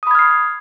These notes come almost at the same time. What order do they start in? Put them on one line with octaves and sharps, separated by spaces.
D#6 B5 G#6 F6 C7